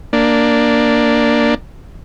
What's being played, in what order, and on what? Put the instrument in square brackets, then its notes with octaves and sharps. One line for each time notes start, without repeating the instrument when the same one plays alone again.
[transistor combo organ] A#3 D4